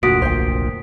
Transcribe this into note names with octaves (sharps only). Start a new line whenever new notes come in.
F1 D2 A#2 F#4 D#6 B6 D7
B1 C5 G5